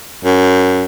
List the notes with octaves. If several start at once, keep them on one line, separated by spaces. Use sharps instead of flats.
F#2